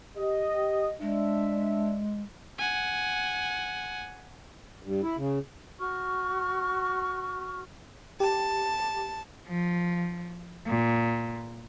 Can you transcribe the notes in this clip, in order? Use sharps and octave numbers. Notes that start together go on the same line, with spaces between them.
G4 D#5
G#3 D4 E5
F#5 G#5
G2
E4
C#3
F#4 C#6 F6
G4 A5
F3
A#2